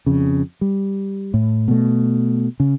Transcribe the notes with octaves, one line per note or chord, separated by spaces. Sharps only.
F2 C#3
G3
A2
B2 A3
C#3